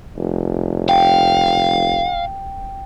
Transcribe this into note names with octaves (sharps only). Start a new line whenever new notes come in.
F1
F5 G5